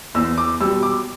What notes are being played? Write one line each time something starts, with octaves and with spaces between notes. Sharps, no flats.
E2 E6
D6
B2 G3 E6
D6